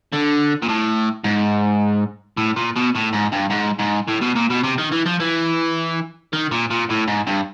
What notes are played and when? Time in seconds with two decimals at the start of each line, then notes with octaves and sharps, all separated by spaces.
0.13 D3
0.63 A#2
0.69 A2
1.24 G#2
2.37 A2
2.56 A#2
2.76 B2
2.95 A2
3.13 G#2
3.32 G2
3.50 G#2
3.79 G#2
4.08 A2
4.21 B2
4.35 A#2
4.50 B2
4.63 C3
4.78 D#3
4.92 E3
5.06 F3
5.20 E3
6.33 D#3
6.51 A#2
6.70 A#2
6.90 A2
7.07 G#2
7.27 G2